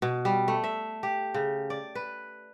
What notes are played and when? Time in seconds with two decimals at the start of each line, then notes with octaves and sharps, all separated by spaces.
0.02 B2
0.25 G3
0.48 A3
0.64 E5
1.03 G4
1.34 C#3
1.70 D5
1.95 B4